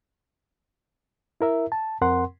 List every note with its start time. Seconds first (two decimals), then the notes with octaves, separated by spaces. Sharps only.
1.41 E4 A#4 E5
1.72 A5
2.01 F2 C4 A#4 F#5 C6